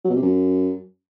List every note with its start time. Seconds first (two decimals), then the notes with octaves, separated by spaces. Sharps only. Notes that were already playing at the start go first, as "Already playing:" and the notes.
0.05 F#3
0.10 B2
0.16 C3
0.22 F#2